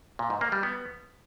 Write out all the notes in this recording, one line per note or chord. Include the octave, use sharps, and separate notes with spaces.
A#2
G#2
A#3
G3
B3